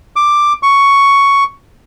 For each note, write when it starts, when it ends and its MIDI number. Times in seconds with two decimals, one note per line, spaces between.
0.16 0.53 86
0.63 1.44 85